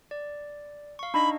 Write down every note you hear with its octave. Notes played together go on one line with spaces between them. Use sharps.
D5
F5 C#6
D4 D#4 D#5 B5